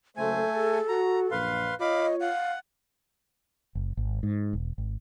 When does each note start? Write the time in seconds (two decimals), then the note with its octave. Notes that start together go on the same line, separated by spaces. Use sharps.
0.17 F#1 A3 A4 C5 G#5
0.54 G#4
0.88 F#4 A#5
1.31 A#1 F#2 B4 F5 C6
1.81 F4 C#5 D#5 F5 B5 D6
2.21 F5 F#5
3.75 F#1
3.97 G#1
4.23 G#2
4.53 E1
4.78 G#1